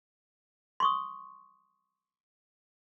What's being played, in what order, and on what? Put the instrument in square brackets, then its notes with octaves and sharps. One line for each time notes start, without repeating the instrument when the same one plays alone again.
[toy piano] C6 C#6 D#6